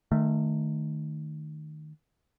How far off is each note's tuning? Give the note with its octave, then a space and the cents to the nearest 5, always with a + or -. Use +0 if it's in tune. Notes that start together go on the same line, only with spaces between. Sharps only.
D#3 -20 A3 +0